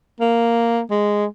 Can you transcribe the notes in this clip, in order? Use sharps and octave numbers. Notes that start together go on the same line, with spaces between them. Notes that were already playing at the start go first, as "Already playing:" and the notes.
A#3
G#3